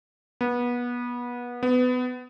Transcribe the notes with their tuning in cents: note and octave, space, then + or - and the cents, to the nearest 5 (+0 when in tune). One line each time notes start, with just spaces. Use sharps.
B3 -25
B3 +25